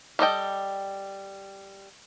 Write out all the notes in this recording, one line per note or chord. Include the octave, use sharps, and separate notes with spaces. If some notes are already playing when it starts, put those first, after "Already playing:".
G3 A4 D#5 G5